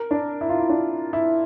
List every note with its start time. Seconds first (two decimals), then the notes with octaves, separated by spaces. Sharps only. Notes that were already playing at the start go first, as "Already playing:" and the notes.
Already playing: A#4
0.11 D4
0.41 E4
0.49 F4
0.59 E4
0.69 D4
1.13 E4